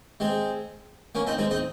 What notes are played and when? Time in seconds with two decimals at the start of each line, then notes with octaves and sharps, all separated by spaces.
0.20 G#3 C4
1.15 A#3 C#4
1.27 C4 D#4
1.38 G#3 C4
1.51 C4 D#4